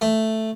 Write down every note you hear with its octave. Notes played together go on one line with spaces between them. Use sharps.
A3